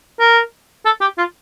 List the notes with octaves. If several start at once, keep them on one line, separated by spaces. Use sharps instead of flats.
A#4
A4
G4
F4